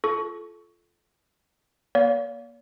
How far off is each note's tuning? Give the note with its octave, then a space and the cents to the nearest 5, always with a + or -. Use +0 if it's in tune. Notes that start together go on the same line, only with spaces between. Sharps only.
F4 -15 A4 -25 C#6 +15
A#3 +35 D5 -45 F5 +10